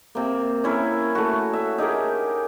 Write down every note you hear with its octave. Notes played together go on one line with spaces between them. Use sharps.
C3 A#3
C#4 E4 A#4
A3 F#4
E5
D#4 G4 G#4 A#4